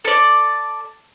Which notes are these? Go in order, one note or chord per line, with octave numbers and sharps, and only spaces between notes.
A4 D5